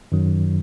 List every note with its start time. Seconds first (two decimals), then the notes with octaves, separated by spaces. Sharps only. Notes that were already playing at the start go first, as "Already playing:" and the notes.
0.12 F#2 D#3 F#3